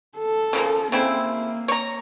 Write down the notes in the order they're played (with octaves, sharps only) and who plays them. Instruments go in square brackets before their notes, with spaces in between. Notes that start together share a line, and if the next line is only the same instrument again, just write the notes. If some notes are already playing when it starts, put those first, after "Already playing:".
[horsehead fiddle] A4
[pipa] C#3 F3 A#3
[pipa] C#3 C4 E4 [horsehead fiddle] A#3
[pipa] C#5 A#5